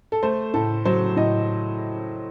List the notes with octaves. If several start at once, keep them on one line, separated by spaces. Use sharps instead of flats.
A4
A3 C5
A2 A4
F#3 C5
A2 D#5